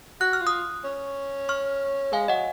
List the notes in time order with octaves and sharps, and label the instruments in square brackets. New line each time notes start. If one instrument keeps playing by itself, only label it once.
[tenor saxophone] F#4 [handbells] F#6
[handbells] F6
[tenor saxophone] F4
[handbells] D#6 F#6
[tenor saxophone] C#4
[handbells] C#6 F6
[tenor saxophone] G#3 [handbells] F5 G#5
[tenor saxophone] F#3 [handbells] D#5 F#5